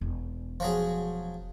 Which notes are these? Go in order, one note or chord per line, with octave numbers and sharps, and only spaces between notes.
E1
F3 F#3 G#4